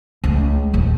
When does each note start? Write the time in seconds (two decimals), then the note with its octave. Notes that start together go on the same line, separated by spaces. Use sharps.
0.24 C#2 A3
0.73 D#2 A#2